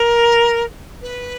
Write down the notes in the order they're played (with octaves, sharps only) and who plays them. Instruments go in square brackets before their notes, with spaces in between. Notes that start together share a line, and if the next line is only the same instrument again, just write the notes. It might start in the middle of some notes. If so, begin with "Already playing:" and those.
Already playing: [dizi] A#4
B4